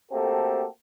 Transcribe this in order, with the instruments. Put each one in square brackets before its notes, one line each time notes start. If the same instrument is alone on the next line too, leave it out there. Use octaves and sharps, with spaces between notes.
[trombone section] A3 A#3 C4 F#4 G4 A4